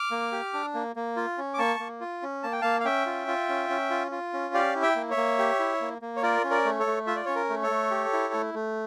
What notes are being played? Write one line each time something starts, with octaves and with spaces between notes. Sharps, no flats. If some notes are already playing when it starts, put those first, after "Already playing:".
Already playing: D6 F6
A#3
G4
D4
A#3
A#3
F4
C#4
D6
A#3 A5 C#6
A#3
F4
C#4
A#3 A5
G5
A#3 F5 A5
F5
C#4 E5 G5
F4
F4
C#4
C#4
F4
F4
C#4
G4 D5 F5
E4
E5 G5
A#3
C#5 E5
A#3
G4
E4
A#3
A#3
C#5
F4 A#4 D5
C#4
A#4 D5
A3
A4 C#5
A3
F4 E5
D5
C#4 C#5
A#4
A3
A4 C#5
A3
G4
E4
A3
A3